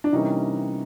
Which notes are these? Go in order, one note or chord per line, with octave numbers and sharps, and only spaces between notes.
D4
C3 E3 G3 A#3 C#4 D#4